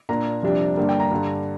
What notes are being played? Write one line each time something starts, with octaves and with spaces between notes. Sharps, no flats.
A#2 A#3 D4 A#5
F2 C3 G3 D4
G2 D3 G3 A#3
G5
A#5
G2 D3 G3